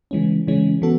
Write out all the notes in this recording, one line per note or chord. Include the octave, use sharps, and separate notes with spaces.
C#3 E3 G#3 C#4
C#3 E3 G#3 C#4
E3 B3 F#4 A4